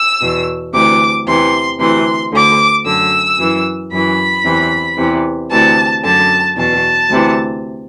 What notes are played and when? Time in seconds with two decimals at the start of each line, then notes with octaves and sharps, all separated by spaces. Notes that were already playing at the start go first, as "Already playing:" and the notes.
Already playing: E6
0.21 E2 B2
0.73 D2 C3 E3 D6
1.26 E2 C3 E3 C6
1.80 D2 C3 E3 C6
2.32 D2 D3 D6
2.85 F#2 D3 E6
3.38 F#2 E3
3.91 F#2 E3 B5
4.45 E2 C3 E3
4.97 E2 C3 E3
5.50 D2 C3 E3 A5
6.04 F#2 D3 A5
6.56 E2 B2 A5
7.10 D2 C3 E3